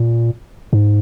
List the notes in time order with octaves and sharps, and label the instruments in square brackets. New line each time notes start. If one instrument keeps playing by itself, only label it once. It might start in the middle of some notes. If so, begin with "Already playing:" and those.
Already playing: [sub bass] A#2
G#2